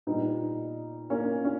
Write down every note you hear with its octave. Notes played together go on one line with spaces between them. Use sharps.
A#2 G3 B3 D#4
A#3 C#4
C#4